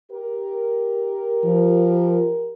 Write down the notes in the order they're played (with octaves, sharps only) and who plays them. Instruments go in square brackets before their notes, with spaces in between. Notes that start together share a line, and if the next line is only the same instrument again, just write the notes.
[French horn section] G4 A#4
[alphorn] F3